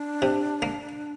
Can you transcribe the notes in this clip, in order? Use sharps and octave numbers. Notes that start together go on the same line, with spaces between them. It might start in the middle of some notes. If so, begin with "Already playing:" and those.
Already playing: D4
C3
A#3